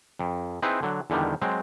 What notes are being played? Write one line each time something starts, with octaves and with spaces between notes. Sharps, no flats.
F2
C4 D#4 E4 G#4 B4
D3 F#3
E2 D3 D#3 G3
F#3 G#3 C4